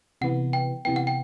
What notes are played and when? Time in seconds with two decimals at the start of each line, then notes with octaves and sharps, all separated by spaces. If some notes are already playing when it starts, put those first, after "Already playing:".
0.21 C3 E3 B3 F#5
0.53 G5
0.85 C3 E3 B3 G5
0.96 F#5
1.07 G5